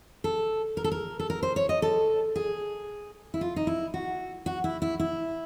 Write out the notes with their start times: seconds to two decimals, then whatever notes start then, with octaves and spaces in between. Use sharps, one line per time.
0.24 A4
0.77 A#4
0.84 A4
0.91 A#4
1.20 A4
1.30 A#4
1.43 C5
1.56 C#5
1.69 D#5
1.82 A4
2.36 G#4
3.34 E4
3.41 F4
3.56 D#4
3.67 E4
3.94 F#4
4.46 F#4
4.64 E4
4.82 E4
5.00 E4